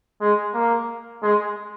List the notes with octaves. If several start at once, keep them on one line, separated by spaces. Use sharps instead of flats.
G#3
A#3
G#3